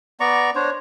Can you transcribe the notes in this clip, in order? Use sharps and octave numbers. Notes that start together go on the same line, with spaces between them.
B3 D5 A#5 C#6
D4 C5 C#5